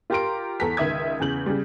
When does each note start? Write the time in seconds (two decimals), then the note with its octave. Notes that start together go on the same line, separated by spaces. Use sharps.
0.10 F4 G4 A#4 A#5 C6 D7
0.60 E2 A4 A#5 B6
0.77 C#2 D#3 E5 D#6 G#6
1.20 E2 C#3 G6 F#7
1.46 C#3 G3